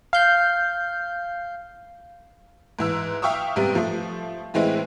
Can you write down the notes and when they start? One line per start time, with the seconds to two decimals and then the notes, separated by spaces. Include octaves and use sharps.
0.13 F5 G6 C7
2.79 G#2 E3 E6
3.22 E5 F5 G5 C#6 D#6 E6
3.56 G#2 C3 G3 B3
3.75 F3 A3
4.54 A2 E3 G#3 C4 E4